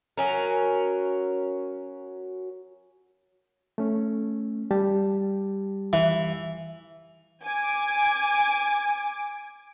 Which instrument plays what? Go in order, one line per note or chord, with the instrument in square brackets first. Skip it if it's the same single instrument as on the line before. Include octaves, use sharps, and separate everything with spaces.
[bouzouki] F#3 C#4 A#4
[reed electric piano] A3 C#4
G3 G4 A5
[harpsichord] E3
[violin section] G#5 D6